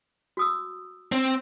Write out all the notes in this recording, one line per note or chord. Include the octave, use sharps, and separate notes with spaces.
F#4 D#6 E6
C4